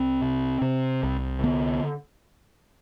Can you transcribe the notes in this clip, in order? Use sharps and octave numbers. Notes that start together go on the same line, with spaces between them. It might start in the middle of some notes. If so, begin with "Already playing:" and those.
Already playing: C2 C4
C3
C3
C2
D3 B3